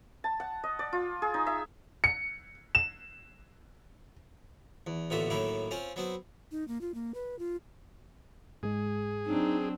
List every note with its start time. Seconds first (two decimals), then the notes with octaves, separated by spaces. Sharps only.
0.24 A5
0.40 F#5
0.64 D#5
0.79 D5
0.93 F4
1.22 G#4
1.34 D#4
1.47 E5
2.04 C#7
2.75 E7
4.87 E2
5.10 A1 A#2 D3 B3 E5
5.30 A2 D#3 F#3 A#3 E4
5.71 C4 C#4 F4
5.96 F#3 B3 C4
6.52 D#4
6.68 A#3
6.81 F4
6.94 A#3
7.14 B4
7.39 F4
8.63 G#2 G#3 G#4
9.27 F#3 C4 D4 D#4